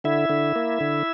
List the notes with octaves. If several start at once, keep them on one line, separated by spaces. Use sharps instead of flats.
D3 E4 E5
D3
A#3
D3